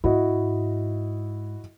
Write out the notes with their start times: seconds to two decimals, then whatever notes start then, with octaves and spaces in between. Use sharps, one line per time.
0.04 G#2 E4 F#4 D#5